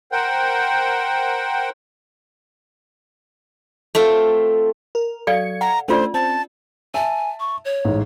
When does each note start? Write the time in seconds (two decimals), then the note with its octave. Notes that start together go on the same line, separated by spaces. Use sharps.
0.12 A#4 C5 F#5 G5
3.95 A3 C4 F4
4.95 A#4
5.27 F#3 A4 D5 F5 G#6 C#7
5.61 F#5 A#5
5.88 A3 C#4 D4 F4 C5 D5
6.14 C4 A5
6.94 E5 G#5 A5
7.40 C#6
7.65 C#5
7.85 A1 G#2